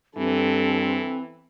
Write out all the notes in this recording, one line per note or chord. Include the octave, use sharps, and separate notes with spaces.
G2 E3 C4 A4